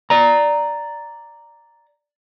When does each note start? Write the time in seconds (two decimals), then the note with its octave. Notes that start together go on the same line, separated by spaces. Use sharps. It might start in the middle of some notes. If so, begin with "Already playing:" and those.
0.10 D5 A#5